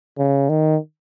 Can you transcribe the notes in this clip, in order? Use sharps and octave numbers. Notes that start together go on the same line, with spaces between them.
C#3
D#3